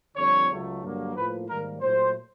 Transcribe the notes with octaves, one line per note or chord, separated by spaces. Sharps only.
F2 D3 G3 C#5
C#2 C#3 F#3 A3
G2 D3 F#3 A#3
A2 F3 A#3 B4
G#2 D#3 G3 A#3 A#4
A#2 F#3 A3 C5